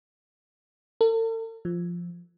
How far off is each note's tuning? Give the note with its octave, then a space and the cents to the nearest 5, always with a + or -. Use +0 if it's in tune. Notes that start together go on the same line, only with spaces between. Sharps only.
A4 +45
F3 -5